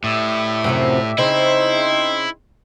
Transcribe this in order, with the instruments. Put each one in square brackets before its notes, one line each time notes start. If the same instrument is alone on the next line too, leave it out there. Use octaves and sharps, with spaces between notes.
[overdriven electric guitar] A2 [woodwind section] G4 D5 E5
[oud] F#2 C3 F3
[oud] C#3 C4 [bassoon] D#4 [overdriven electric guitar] E4 [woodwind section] E5 G5 C6